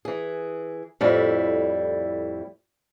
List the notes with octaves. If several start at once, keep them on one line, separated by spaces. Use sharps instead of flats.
E3 G#4
F2 A2 G3 E4